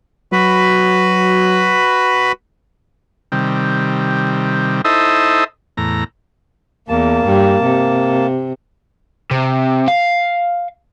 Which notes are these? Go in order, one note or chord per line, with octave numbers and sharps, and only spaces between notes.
F#3 F#4 B4 B5
C3 D#3 G3
D#4 E4 A4 C5 D#5 E5
E2 A2 A#5
E2 A#3 A5
G2
C3
C3
F5